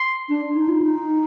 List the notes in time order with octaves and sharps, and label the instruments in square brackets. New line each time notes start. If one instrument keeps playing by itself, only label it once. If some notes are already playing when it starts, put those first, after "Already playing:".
Already playing: [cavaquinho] C6
[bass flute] D4
D#4
F4
D#4